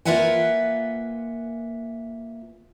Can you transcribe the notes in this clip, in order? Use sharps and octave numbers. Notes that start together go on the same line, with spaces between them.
A#3 F4 B4 E5 F#5 G#5